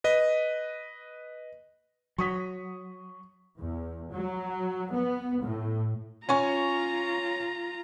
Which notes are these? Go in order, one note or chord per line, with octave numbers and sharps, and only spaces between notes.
B4 D#5
F#3 C#6 D#6 B6
E2
F#3
B3
A2
C#4 F4 G#5 A#5 C#6